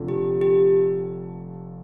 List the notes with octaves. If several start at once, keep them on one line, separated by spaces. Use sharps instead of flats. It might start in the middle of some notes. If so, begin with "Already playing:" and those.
Already playing: F1 F2 D3 A3
G4
G4